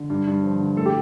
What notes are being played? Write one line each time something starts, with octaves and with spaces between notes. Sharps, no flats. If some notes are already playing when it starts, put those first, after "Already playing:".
Already playing: D3
G2
G2
F3
D3
A2 A4
G4